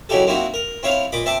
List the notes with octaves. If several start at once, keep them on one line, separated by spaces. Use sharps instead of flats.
C#3 F#3 D#4 E4 G4 A4
A#3 C4 D#4 E4 F#4
A#4
C4 E4 C#5 F5
A#2 D#5 B5 D6
C4 E5 A5 D6